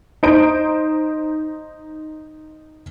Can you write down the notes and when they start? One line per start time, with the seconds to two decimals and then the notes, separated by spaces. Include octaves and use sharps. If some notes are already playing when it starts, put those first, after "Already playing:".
0.23 D#4 C5 D7